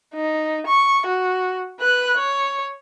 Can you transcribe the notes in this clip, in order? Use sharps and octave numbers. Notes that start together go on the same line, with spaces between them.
D#4
C#6
F#4
B4 F#6
C#5